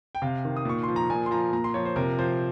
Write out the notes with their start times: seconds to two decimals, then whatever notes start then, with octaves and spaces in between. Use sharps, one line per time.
0.15 G5
0.22 C3 F5
0.45 D#3
0.57 D#6
0.65 A#2 C#6
0.83 F3 C6
0.96 A#5
1.10 A#2 G#5
1.26 C6
1.31 F3 A#5
1.53 A#2 A#5
1.64 C6
1.74 F3 C#5
1.86 C5
1.96 C3 A#4
2.19 F3 C5